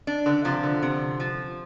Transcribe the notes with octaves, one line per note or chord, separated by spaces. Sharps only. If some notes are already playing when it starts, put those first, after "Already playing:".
D4
D3
C3 F3
D3
C3
F3